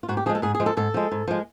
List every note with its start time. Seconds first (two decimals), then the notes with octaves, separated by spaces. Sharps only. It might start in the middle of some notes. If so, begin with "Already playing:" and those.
0.03 F4
0.08 G#2 F#4
0.17 G4
0.26 F3 G#4
0.29 G#3
0.35 A4
0.42 G#2 G#4
0.55 G#4
0.60 F3 G#3
0.66 A4
0.77 G#2 A4
0.94 F3 G#3
1.12 G#2
1.28 F3 G#3